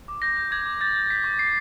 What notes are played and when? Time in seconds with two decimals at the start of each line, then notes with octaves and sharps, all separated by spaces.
0.08 D6
0.22 G6 A#6
0.37 G6
0.51 D6 G#6
0.65 D6
0.81 G6 A6
0.96 G6
1.10 G6 B6
1.24 C#6
1.39 C#6 C7